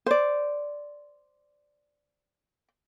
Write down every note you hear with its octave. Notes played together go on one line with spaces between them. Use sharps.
C5 D5